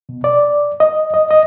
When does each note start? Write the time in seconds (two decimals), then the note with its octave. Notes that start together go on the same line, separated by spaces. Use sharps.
0.09 B2
0.24 D5
0.80 D#5
1.14 D#5
1.31 D#5